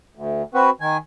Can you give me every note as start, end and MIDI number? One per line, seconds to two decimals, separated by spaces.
0.15 0.42 38
0.54 0.70 60
0.54 0.70 66
0.54 0.70 71
0.81 0.97 51
0.81 0.97 80